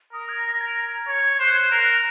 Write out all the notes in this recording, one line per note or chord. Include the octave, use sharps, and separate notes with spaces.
A#4 D#6
G#6
A#6
G#6
C#5
C5 F#6
A#4